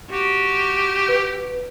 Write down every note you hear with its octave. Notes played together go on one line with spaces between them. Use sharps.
F#4 G4
B4